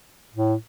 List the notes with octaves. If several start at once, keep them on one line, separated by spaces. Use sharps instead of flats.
A2